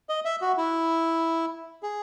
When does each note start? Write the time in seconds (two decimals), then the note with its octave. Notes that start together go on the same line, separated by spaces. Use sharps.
0.09 D#5
0.25 E5
0.41 F#4
0.57 E4
1.83 G#4